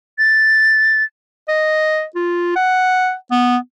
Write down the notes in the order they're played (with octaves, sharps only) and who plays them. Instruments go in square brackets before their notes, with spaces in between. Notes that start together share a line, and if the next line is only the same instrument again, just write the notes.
[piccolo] A6
[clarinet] D#5
F4
F#5
B3